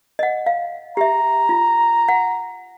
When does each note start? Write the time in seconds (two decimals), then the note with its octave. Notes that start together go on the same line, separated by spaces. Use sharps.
0.19 D#5 F#5
0.46 F5
0.97 G4 E5 A#5
1.49 F4
2.08 F#5